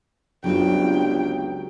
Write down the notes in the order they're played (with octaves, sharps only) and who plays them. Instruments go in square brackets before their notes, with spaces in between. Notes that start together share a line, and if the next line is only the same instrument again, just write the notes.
[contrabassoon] G1 [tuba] C#2 [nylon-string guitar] F#3 G3 C4 [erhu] G5